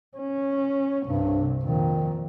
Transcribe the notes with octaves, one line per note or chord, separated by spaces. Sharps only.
C#4
C2 G2 C3
F2 A#2 D#3